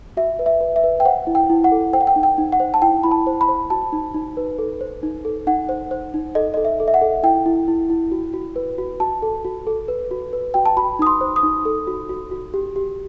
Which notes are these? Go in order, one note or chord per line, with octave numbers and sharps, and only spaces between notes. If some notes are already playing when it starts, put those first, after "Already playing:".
F#4 E5
B4
E5
B4
E5
B4
G5
C5 F#5
E4
G5
E4
F#5
A4
C5 G5
F#5
G5
D#4
G5
D#4
F#5
C5
A5
E4 G5
E4 B5
A5
C5
B5
C5
F#4 A5
D#4
D#4
B4
A4
C5
D#4
A4
D#4 F#5
C5
C5
D#4
A4 D#5
A4 D#5
E5
A4
E5
F#5
A4
E4 G5
E4
E4
E4
F#4
F#4
B4
F#4
F#4 A5
A4
F#4
A4
B4
F#4
B4
F#4 G5
A5
F#4 B5
D#4 D#6
C6
C5
D#6
D#4
A4
F#4
F#4
F#4
G4
G4